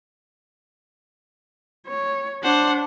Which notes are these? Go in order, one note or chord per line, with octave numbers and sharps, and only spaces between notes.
C#5
D4 C5 F#5